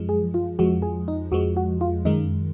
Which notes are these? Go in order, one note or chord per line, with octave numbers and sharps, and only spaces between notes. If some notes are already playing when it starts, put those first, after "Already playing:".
Already playing: F#2 F3 G#3
G#4
F4
F2 F3 G#3 F#4
G#4
D#4
F2 F3 G#3 F#4
F#4
F4
F#2 D#3 G#3 D#4